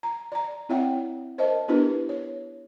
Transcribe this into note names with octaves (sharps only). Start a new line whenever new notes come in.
A#5
D5 A#5
C4 E4 C#5 E5 F#5 G5
A#4 C5 D#5 E5 A5
B3 D4 E4 G4 A#4 B4
C#5